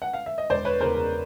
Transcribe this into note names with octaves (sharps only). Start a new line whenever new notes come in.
F#5
F5
E5
D#5
E1 C5 D5
B4 C#5
E2 C#3 A#4 C5
A#4